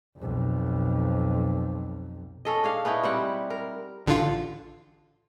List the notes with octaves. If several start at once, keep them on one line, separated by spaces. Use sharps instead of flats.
B1 F2
C#4 A4 D#5
D4 G#4 F5
B3 C#4 D#4 E4
G3 C4 F#5
A#4
A1 D3 F4